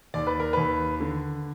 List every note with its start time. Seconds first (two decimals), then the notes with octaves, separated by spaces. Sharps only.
0.14 D#2 D5
0.27 B4
0.40 A#4
0.53 D#2 B4
1.00 D3